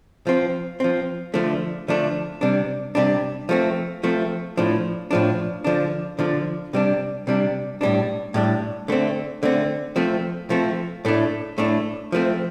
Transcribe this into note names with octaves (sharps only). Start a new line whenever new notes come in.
F3 C4
F3 C4
D3 F3 A3 D4
D3 F3 A3 D4
C3 G3 D4
C3 G3 D4
F3 A3 C4
F3 A3 C4
A2 F3 D4
A2 F3 D4
D3 F3 D4
D3 F3 D4
C3 G3 D4
C3 G3 D4
A2 G3 D4
A2 G3 D4
D3 A3 C4
D3 A3 C4
F3 A3 C4
F3 A3 C4
A2 A3 D4
A2 A3 D4
F3 A3 C4